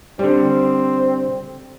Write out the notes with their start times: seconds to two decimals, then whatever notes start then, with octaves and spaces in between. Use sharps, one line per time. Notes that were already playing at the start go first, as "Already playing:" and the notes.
0.19 D3 G3 C4